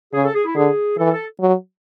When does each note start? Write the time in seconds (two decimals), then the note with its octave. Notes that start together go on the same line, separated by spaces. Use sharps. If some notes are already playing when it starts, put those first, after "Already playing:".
0.13 C#3 G#4
0.24 A4
0.34 G#4
0.45 E4
0.55 D3 G#4
0.98 E3 A4
1.12 A4
1.41 F#3